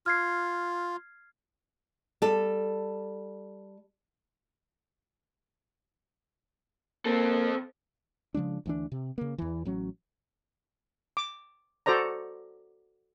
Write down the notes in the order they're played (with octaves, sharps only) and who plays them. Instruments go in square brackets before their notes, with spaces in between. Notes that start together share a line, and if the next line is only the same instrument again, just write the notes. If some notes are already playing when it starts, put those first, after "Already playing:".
[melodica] F4 [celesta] F6 G#6 C7
[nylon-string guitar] G3 A4
[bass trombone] A#3 [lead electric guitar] C4 A4
[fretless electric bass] C#3 F3 G#3 D4
D2 E3 D4
C3
C#3 A#3
E2 E3
A1 F#3 C#4
[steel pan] D6
F#4 A4 C5 D5 A#5